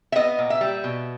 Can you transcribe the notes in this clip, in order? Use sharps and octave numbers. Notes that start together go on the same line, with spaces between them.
E5
B3 D#5
A#2
E5
G3
B2